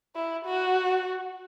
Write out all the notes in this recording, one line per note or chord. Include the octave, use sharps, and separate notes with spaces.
E4
F#4